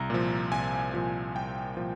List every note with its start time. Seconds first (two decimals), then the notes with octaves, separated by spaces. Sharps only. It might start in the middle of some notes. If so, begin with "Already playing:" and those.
Already playing: C2 A#5
0.10 A#2 F3
0.51 C2 G#5
0.94 A#2 F3
1.35 C2 G5
1.77 A#2 F3